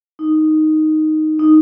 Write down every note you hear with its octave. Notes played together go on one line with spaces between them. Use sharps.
D#4
D#4